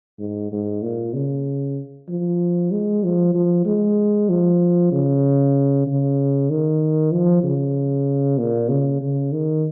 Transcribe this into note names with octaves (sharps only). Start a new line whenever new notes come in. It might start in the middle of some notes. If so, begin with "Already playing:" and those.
G#2
G#2
A#2
C#3
F3
G#3
F3
F3
G#3
F3
C#3
C#3
D#3
F3
C#3
A#2
C#3
C#3
D#3